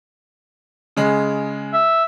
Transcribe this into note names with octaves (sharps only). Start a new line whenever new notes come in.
C#3 G#3
E5